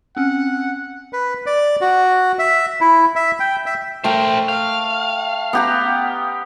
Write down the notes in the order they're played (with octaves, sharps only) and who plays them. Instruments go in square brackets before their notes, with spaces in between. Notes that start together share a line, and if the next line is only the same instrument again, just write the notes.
[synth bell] C4 C#4 [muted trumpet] F#5
[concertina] B4
D5
F#4
E5
E4
E5
G5
E5
[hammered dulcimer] A3 G5 [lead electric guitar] A#4 C5
[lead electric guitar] F5
[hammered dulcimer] B3 G4 A#5